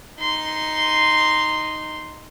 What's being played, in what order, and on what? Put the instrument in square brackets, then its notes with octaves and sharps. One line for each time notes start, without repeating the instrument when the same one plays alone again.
[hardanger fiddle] D#4 C6